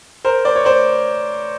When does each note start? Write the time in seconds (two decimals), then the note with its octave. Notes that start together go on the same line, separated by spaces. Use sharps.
0.25 A#4 C5
0.45 C5 D5
0.56 C#5
0.65 C5 D5